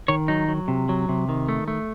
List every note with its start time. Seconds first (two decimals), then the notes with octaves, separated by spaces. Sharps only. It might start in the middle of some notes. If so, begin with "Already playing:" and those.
0.08 D#3 C#5
0.28 F#3 D#4
0.48 F#3
0.68 C3
0.89 F#3
1.09 C3
1.29 D#3
1.49 A3
1.68 A3